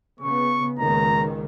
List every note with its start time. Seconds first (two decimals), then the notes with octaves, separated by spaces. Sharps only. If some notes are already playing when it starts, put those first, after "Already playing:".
0.21 C#3 B3 C#6
0.79 C#2 A#2 D#3 A#5